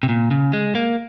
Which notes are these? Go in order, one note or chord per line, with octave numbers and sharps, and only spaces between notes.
C3
A#2
C#3
G#3
A#3